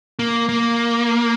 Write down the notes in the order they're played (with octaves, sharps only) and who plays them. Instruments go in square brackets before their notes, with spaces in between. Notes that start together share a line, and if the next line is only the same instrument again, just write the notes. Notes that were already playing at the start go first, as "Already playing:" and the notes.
[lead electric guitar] A#3
A#3